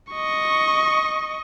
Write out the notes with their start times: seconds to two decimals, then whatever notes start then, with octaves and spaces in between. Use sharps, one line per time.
0.12 D#5 C#6